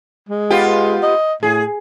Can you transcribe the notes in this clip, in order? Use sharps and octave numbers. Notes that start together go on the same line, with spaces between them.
G#3
B3 F4 G4
D#5
A2 G#4